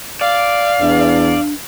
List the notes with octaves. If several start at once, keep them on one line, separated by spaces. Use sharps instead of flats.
D5 F5
E2 D4